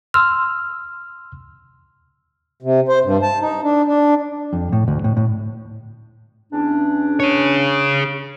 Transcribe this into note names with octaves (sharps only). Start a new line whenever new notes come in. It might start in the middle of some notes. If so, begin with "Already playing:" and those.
C6 E6 F6
C3
C5
G2
A5
D#4
D4
D4
F2
A2
D2
A2
A2
E2 C#4 D4
G#4 C#5